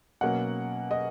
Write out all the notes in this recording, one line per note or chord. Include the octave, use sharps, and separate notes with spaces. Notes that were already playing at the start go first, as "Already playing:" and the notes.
B2 F#3 A#3 C#4 F#5
D#5